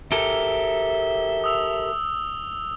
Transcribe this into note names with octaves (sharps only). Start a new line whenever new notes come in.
G4 A4 A#4 E5 G7
D#6 E6 F7